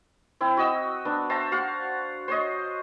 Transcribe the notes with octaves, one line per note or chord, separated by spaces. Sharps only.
C4 E4
F#4 D#5 E6
B3 D4
C5 E5 A5 A#5
F#4 F5 F#5
C5 C#5 D#5